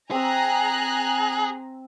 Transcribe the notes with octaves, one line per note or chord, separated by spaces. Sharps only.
C4 G#4 G#5 A#5 E6 F#6